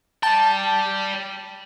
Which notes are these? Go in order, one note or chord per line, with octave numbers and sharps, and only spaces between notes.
D5 G5 A5